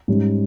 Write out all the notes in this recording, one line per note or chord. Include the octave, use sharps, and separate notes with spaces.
G#2 G3 C#4